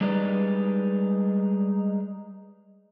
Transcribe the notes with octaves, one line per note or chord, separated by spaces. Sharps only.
G3 G#3 D#4 B4 D5